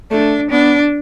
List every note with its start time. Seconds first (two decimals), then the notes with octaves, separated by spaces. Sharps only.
0.11 A3 D4
0.51 B3 D4